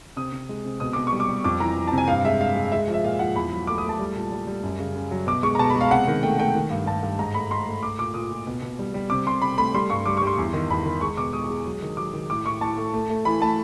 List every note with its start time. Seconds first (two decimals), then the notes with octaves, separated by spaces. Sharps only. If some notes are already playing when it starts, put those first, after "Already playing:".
0.17 C3 D#6
0.32 C3
0.49 G#3
0.65 C3
0.80 B2 D#6
0.93 B2 D6
1.07 C#6
1.13 G3
1.20 D6
1.28 G3
1.44 F2 D6
1.60 E3 A#5
1.76 E3
1.88 A5
1.92 C3
1.98 G#5
2.08 G2 F5
2.25 G#3 E5
2.40 G#3 F5
2.56 G#3
2.72 G#3 E5
2.88 F3
2.94 E5
3.04 A#2 F5
3.19 F3 F#5
3.35 E2 B5
3.52 F#3
3.67 A3 D6
3.78 D#6
3.83 A3
3.89 A5
3.99 G3
4.15 A#2
4.32 G3
4.47 G3
4.63 F#2
4.79 C#3
4.95 C#3
5.11 F#3
5.27 B2 D6
5.43 G#3 C#6
5.55 A#5
5.59 B2 A5
5.70 B5
5.75 G#3
5.81 F5
5.91 C3 F#5
6.08 D#3
6.23 A3 G5
6.39 A3 G5
6.55 D#3
6.70 G2
6.86 G2 A5
7.03 G2
7.19 G#2 A#5
7.34 A3 B5
7.51 G#2 C6
7.67 A3
7.82 A3 D6
7.98 A#2 D6
8.14 A#2 D#6
8.31 A#2
8.47 B2
8.62 B2
8.79 G3
8.94 G3
9.10 C3 D6
9.26 C3 C6
9.42 C3 B5
9.58 A3 B5
9.74 G3 C6
9.90 G2 C#6
10.06 G3 D6
10.17 C#6
10.22 G3 C6
10.37 E2
10.53 D#3
10.70 E2 B5
10.86 D#3
11.01 G#3 C#6
11.17 B2 D6
11.33 G#3 D#6
11.50 G#3
11.65 F#3
11.82 D#3
11.97 F#3 D6
12.13 D#3
12.30 A2 D6
12.45 A2 C#6
12.61 A2 A5
12.78 A3
12.94 A3
13.10 A3
13.25 E3 B5
13.41 A3 A5